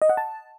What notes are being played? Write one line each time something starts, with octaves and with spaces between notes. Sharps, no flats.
D#5
F#5
A5